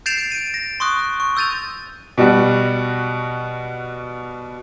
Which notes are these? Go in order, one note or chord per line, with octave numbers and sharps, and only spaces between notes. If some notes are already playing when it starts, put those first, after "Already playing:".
G6 A6 C7 D7 E7 F7
D7 D#7
A#6
C6 C#6 D#6 F#6
C#6
E6 G6 A6 D#7 F7
B2 G3 F#4